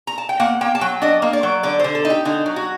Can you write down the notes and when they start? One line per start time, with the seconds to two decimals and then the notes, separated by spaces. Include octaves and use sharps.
0.07 A#5
0.18 A5
0.29 G5
0.40 A#3 F#5
0.61 A#3 G5
0.75 A5
0.81 F#3 G5
1.02 D4 D#5
1.22 A#3
1.33 D5
1.43 F#3
1.63 D3 D5
1.79 D3 C5
1.95 A4
2.05 D#4
2.10 G4
2.25 D3 D#4
2.46 F#3
2.56 F#4